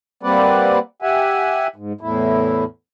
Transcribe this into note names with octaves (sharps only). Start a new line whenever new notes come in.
G3 A#3 C4 B4 D5 F#5
G4 E5 F#5 G#5
G#2
E2 A2 E4